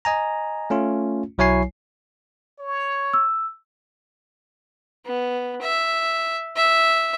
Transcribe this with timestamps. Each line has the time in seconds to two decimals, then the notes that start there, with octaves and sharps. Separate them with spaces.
0.05 D#5 G#5 A#5
0.70 A3 C#4 F4
1.38 B1 F#3 E4 C#5 G#5 C7
2.59 C#5
3.13 E6
5.06 B3
5.62 E5
6.56 E5